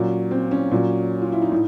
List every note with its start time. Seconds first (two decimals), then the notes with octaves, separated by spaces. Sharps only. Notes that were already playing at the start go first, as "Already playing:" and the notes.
Already playing: A#2 F#3 C#4
0.31 C4
0.51 C#4
0.71 A#2 F#3
1.22 F4
1.32 E4
1.42 D#4
1.52 A2